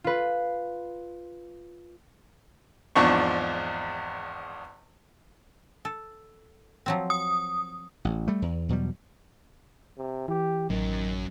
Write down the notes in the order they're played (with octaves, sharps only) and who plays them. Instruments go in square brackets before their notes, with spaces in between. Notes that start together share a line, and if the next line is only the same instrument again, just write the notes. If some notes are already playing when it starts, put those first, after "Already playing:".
[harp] F4 B4
[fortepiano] G#1 E2 F3 D4 C#6
[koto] A4
F3 F#3 C4
[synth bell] D#6
[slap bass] A1
G3 A3
E2
E2 B2 F#3 G3
[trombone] C3
[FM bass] E3 [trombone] G4
[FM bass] A1 [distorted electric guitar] F#2 [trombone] D#3